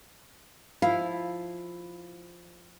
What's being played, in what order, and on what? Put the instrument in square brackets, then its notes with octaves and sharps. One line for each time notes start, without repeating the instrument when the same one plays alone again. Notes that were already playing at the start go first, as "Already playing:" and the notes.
[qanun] F3 E4 [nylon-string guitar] F5